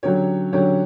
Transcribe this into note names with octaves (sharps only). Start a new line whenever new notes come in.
D3 F#3 C#4 G4 C#5
D3 F#3 C#4 G4 C#5